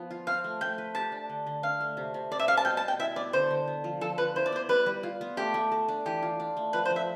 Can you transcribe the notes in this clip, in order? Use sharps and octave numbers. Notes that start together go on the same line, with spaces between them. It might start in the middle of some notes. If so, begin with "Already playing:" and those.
Already playing: F3 B3
F4
C4 F5
A3
A3 G5
B4
G4 A5
D4
D3
D3
D4 F5
A3
C3
C3
C4 D5
E5
G3 F5
A5
B2 G5
A5
B2
G5
E4 E5
B3 D5
D3 C5
D3
B3
F3
F3 A4
F3 B4
E4 C5
D5
B3 C5
G3 B4
G3
F4
B3
A3 G4
A3
A4
D4
E3 G4
F4
D4
A3
F3 B4
C5
F3
E5